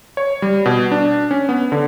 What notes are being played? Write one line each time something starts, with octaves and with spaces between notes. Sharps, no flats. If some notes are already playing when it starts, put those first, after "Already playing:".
C#5
G3
B2
D4
C#4
B3
D3